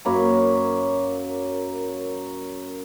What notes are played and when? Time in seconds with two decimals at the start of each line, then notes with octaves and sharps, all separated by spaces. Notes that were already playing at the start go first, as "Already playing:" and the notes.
0.05 F#2 A#3 C#5 B5